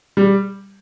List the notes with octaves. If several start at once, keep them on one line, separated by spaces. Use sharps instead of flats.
G3